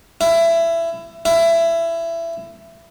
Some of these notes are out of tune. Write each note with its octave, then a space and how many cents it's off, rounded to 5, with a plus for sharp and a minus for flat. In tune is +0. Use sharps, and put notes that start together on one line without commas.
E4 +20
E4 +20